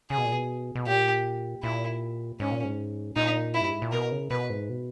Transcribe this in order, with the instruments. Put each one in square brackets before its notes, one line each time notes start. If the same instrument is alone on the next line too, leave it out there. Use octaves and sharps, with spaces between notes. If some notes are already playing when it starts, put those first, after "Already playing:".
[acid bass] C#3 [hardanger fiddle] G#4
[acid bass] B2
A#2
B2
B2
[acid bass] A#2 [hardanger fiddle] G4
[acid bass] A#2 [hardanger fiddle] E4
[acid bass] G#2 [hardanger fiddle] C#4
[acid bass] A#2
G#2
[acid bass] A#2 [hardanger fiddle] D#4
[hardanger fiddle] E4
[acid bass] G2
G#2
A#2
[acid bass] B2 [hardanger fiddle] A#4
[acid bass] C#3
[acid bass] B2 [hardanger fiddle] B4
[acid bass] G#2
B2